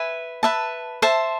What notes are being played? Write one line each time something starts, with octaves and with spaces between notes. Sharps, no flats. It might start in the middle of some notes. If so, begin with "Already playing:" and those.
Already playing: B4 E5 G#5
B4 E5 A5
C5 E5 A5